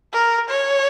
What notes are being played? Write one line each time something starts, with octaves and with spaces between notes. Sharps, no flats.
A#4
C#5